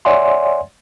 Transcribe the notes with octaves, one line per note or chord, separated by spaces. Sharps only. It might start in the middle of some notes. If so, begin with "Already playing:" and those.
C#5 D5 E5 F#5 G#5 C6